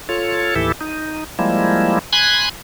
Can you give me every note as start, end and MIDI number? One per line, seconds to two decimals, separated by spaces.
0.09 0.55 65
0.09 0.55 69
0.09 0.55 73
0.56 0.72 39
0.56 0.72 45
0.56 0.72 52
0.56 0.72 64
0.56 0.72 67
0.56 0.72 69
0.81 1.24 63
1.39 1.99 53
1.39 1.99 55
1.39 1.99 56
1.39 1.99 58
1.39 1.99 64
2.13 2.49 80
2.13 2.49 83
2.13 2.49 84
2.13 2.49 90
2.13 2.49 92